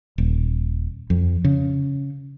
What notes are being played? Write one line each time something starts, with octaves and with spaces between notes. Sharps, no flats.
D#1
F2
C#3